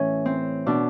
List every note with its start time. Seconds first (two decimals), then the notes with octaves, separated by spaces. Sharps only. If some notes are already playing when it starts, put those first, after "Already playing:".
Already playing: A2 E3 C#4
0.26 C4
0.66 B2 D4